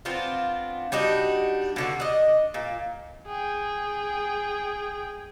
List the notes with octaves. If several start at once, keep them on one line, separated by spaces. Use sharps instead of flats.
B3 C4 D4 F4
G3 D4 D#4 F#4
B2 D3 F#4
D4 D#5
A#2
G#4 G5